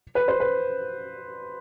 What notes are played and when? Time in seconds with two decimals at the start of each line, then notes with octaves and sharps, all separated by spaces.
0.15 B4
0.28 C5
0.40 B4